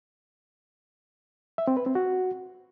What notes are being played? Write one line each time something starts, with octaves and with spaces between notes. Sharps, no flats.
E5
C4
B4
C4
F#4